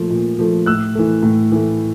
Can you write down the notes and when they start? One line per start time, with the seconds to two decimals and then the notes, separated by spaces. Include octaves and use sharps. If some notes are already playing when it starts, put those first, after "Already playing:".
Already playing: A#2 F3 A3
0.10 A#2
0.39 F3 A3
0.66 A2 E6 F#6
0.95 E3 A3
1.23 A2
1.52 E3 A3